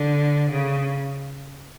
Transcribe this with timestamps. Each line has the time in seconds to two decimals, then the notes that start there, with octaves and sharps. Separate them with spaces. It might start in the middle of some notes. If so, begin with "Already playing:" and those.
Already playing: D3
0.51 C#3